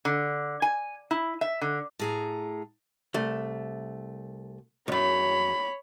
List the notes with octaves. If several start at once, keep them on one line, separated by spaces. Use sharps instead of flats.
D3
G#5
E4
E5
D3
A2 G#4 A#5
C2 A3
B1 F#2 C#5 B5